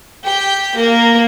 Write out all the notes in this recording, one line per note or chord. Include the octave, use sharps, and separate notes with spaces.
G4 G5
A#3 A#4